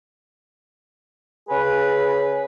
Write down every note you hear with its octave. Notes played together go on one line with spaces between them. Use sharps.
C#3 G#4 B4